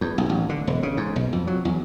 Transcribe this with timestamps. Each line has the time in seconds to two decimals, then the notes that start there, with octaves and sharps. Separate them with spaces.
0.01 E2
0.18 B1
0.29 A1
0.49 D3
0.67 E1
0.83 C#3
0.97 G#2
1.16 B1
1.33 F2
1.47 F#3
1.65 E2